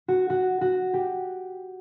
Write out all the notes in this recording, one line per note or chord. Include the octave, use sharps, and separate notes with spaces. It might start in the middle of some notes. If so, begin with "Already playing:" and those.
F#4
F#4
F#4
G4